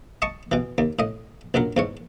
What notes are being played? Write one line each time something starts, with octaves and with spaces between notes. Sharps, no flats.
D#5 A5 C#6
B2 E3
D#2
A2 D#5
A#1 F#2 F#3 A#4
E2 G#2 C#5